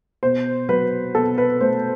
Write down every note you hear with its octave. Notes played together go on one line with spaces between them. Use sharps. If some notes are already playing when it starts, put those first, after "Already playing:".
B2 C5
F#3 B4
B2 A4
B4
A3 C5